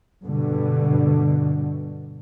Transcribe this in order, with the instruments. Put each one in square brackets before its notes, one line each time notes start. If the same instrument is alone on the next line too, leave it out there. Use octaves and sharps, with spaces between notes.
[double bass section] G2 B2 D3